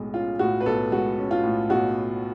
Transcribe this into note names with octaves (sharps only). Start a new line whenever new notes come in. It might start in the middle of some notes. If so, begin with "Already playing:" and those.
Already playing: B1 A2 G#3
C#4 F4
A2 F#4
B4
B1 A4
G#3 F#4
C#4
F4
A2
B1 F#4